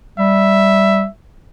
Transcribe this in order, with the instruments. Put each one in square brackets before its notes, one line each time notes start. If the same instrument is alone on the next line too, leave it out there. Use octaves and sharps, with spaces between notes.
[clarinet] G3 [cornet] E5